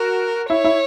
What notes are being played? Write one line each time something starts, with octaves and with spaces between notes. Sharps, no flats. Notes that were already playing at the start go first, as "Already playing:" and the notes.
Already playing: F#4 A#4
E4 C#5
E4